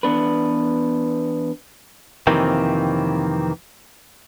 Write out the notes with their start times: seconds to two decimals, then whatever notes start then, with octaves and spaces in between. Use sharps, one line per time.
0.03 E2 B3 D4 B4
2.27 F2 C3 D#3 E3 A#3 C4